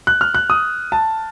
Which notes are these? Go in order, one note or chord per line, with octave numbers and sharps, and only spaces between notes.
F#6
F6
F#6
D#6
A5